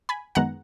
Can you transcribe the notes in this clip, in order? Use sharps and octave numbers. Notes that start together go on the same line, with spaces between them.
G#5 B5
F#2 D#3 G#3 B3 F#5 A#5